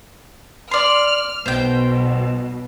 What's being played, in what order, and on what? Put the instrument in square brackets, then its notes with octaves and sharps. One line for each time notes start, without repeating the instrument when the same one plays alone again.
[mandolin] D5 C6 [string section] F6
[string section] B1 B2 [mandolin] C5 G5